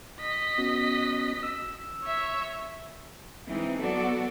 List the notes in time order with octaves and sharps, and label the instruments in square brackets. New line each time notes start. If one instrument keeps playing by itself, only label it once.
[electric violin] D#5 B6
[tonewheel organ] B3 C#4 F#4
E6
[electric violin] C#5 E5
[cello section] E3 G#3 C4 D#4
F#3 B3 F#4 A4 D5